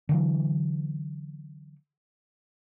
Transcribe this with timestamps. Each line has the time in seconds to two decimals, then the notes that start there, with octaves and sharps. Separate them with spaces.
0.09 D3 E3 F#3